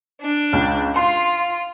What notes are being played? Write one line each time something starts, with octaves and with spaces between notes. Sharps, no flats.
D4
C#2
F4 C6